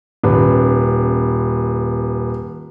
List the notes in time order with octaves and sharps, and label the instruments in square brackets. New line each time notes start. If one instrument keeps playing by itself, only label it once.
[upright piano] D#1 B4